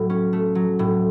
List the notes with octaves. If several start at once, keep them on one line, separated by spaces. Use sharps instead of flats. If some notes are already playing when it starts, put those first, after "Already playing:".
Already playing: A2 F#3
C#4
A3
F#3
A2